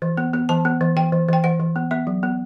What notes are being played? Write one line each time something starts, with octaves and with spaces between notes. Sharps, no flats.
E3
B3
B3
E3 A5
B3
E3
E3 G5
E3
E3 G5
E3 F#5
E3
B3
B3 E5
F#3
B3